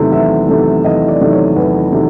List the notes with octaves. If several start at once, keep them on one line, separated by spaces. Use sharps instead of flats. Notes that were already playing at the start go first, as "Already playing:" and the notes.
Already playing: E2 C3 D#3 F#3 A3
E2 E5
C3 D#3 F#3 A3
E2 D#5
D5
C3 D#3 F#3 A3
C#5
E2 B4
C3 D#3 F#3 A3